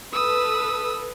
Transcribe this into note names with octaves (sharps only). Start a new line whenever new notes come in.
A4 B4 D#6 E6